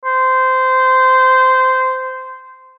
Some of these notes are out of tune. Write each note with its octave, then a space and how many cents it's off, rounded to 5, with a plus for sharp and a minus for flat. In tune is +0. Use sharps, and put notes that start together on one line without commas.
C5 -15